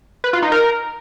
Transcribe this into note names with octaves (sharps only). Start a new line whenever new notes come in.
B4
F4
D#4
A#4